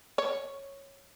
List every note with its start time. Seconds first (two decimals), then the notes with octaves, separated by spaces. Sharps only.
0.18 C#5